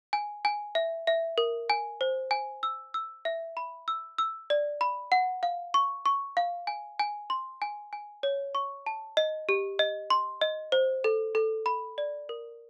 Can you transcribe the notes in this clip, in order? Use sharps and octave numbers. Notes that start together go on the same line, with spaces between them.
G#5
G#5
E5
E5
A#4
G#5
C5
G#5
E6
E6
E5
B5
E6
E6
D5
B5
F#5
F5
C#6
C#6
F5
G#5
G#5
C6
G#5
G#5
C#5
C#6
A5
D#5
G4
D#5
C6
D#5
C5
A4
A4
B5
D5
A#4